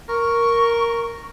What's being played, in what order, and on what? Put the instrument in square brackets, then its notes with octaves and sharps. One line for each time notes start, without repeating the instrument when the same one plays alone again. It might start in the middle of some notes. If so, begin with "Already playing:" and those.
[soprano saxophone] A#4 [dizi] C#6